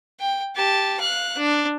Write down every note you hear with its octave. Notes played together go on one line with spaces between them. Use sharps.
G5
G4 A5
F5 F#6
D4